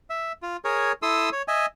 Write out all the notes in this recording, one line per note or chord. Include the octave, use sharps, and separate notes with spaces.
E5
F4
G#4 A#4 C#5
E4 A4 C6 D#6 E6
C#5
D#5 E5 G#5